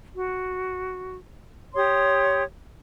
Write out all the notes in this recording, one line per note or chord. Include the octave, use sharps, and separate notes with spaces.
F#4
G4 C#5 C6 D#6